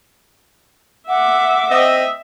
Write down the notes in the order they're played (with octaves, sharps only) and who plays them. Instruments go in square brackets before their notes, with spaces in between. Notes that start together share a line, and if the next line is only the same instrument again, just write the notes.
[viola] E5 D6 [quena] F#5
[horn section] C4 D#5 [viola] E5